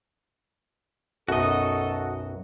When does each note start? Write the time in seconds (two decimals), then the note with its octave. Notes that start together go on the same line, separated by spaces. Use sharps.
1.28 B1 F#2 F#4 A4 D#5